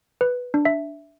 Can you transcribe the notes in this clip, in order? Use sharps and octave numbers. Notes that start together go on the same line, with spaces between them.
B4
D4
E5